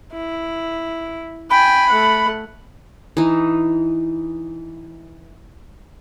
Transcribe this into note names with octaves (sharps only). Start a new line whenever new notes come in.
E4
G5 G#5 B5
A3 F#5
E3 D#4